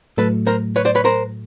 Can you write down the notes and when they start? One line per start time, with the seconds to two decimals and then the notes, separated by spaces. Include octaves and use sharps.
0.18 A2 F#3 A3 A4 B4
0.47 A#4 C5
0.76 B4 C#5
0.85 C5 D5
0.95 B4 C#5
1.05 A#4 C5